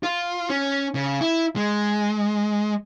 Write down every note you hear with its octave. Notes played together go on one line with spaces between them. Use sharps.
F4
C#4
C#3
E4
G#3